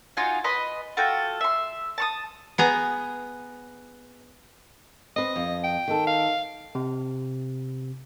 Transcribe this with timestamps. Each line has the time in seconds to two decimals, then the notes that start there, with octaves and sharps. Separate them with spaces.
0.17 D#4 F4 F#4 G#5
0.44 B4 D#5 B5 C6
0.97 F4 F#4 A4 G5
1.41 E5 C6
1.98 A5 C#6 D#6
2.58 B3 G#4 A#5
5.16 C4 B4 D#5
5.36 F2
5.64 G5
5.88 D#3 A4
6.07 F5
6.75 C3